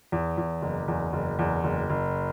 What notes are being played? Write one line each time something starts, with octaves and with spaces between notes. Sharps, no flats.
E2
E2
F#1
E2
F#1
E2
F#1
F#1